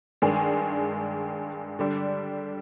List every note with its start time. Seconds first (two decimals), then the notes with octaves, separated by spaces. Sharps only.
0.22 G2 D#3 G#3 D4 G#4
1.79 D3 G3 D4